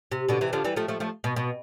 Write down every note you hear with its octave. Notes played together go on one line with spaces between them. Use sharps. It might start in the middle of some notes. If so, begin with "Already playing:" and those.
C3
B2 D3
C3 E3
D3 F3
E3 G3
F3 A3
F3 A3
F3 A3
B2
B2